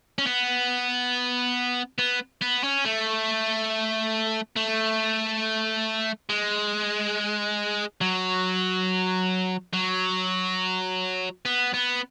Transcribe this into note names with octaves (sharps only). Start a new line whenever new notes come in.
C#4
B3
B3
B3
C#4
A3
A3
G#3
F#3
F#3
B3
B3